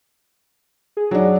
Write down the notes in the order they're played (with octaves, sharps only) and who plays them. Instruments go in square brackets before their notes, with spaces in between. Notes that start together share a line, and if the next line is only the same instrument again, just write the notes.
[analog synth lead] G#4
[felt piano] F#3 D4